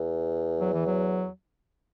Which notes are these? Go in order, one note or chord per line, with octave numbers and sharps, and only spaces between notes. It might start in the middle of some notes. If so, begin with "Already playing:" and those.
Already playing: E2
F#3
E3
F#3